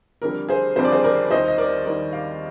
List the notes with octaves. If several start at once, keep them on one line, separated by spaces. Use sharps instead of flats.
F2 D3 G3 A#4
G#4 C5
F2 D3 G3 C5
D5
G#4 C5
A#4 D5
D#2 D#3 G3 C5 D#5
D#5
A#4 D5
D#2 D#3 G3 A#4 D5
D5 F5